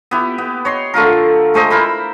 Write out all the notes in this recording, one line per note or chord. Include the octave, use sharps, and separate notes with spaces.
B3 E4 G4
B3
C#5 D#5 C6
D3 A3 F4 A#4
G#3 A3 C5 D#5
E4 A#4 C5 B5